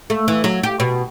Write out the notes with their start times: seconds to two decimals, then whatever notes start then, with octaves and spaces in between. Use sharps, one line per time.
0.10 A3
0.28 E3
0.44 F#3
0.63 G4
0.80 B2